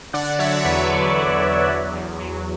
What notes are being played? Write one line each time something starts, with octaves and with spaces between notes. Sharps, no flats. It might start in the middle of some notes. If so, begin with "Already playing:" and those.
D3 D5 F#5
F#3 C#5 E5
E2 B4 D5
E2
F#3
E2
F#3
E2
F#3